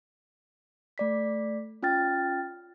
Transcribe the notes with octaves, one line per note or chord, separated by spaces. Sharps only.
A3 D5 B6
C#4 F4 G5 F6 A6